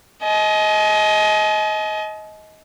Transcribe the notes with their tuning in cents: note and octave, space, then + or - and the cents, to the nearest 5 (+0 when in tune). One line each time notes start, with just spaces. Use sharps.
D#5 +20 G#5 +45